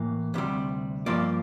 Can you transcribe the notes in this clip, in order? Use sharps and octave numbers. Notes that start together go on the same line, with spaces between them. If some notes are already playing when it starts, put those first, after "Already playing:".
Already playing: A2 E3 A#3
D2 C3 G3
G2 F3 A#3 D5